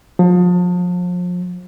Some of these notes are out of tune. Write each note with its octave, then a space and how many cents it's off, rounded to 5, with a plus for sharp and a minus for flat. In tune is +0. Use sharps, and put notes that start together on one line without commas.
F3 +35